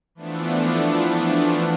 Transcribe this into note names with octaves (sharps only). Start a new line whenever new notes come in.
E3 F3 A3 B3 D4